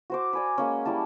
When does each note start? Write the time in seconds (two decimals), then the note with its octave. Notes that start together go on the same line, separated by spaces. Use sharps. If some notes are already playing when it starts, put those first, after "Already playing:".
0.10 F#4 C5 D6
0.33 D5 G#5 B5
0.58 G#3 A#3 C#4
0.85 G3 E4 A5